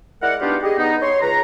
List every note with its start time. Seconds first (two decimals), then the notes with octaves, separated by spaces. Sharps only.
0.22 G#3 E4 A#4 D5 F#5
0.41 G3 B3 D4 D#4 F4 G4
0.63 G4 G#4 D#5
0.77 B3 D#4
1.02 C#5 C6
1.21 C#2 B4 A#5